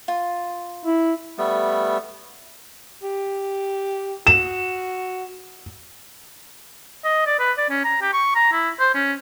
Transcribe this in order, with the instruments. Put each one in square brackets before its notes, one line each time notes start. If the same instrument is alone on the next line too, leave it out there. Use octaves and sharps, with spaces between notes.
[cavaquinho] F4
[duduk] E4
[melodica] G3 A3 B3
[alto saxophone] G4
[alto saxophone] F#4 [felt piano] E7
[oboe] D#5
D5
B4
D5
C#4
A#5
G4
C#6
A#5
E4
C5
C#4